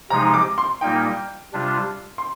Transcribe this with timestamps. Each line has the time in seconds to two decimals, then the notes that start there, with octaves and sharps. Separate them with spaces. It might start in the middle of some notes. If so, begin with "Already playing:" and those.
0.10 C3 F3 G#3 D#4 A#5
0.34 D6
0.58 C6
0.81 A#2 G3 A#3 D#4 G5
1.53 C3 G3 D4 F4
2.18 C6